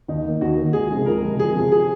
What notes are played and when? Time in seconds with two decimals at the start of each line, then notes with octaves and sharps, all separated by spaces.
0.08 D#2 D#4
0.25 D#3 A#3
0.41 D#2 F#4
0.58 D#3 A#3
0.73 C#2 G#4
0.90 C3 F3 G#3
1.06 C#2 A#4
1.23 C3 F3 G#3
1.39 F2 G#4
1.55 C3 F3
1.72 G#4